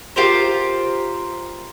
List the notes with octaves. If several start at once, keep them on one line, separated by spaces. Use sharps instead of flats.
F4 G4 A#4 C5